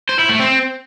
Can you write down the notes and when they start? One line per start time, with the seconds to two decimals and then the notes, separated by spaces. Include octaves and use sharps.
0.09 C5
0.19 E4
0.29 A3
0.39 C4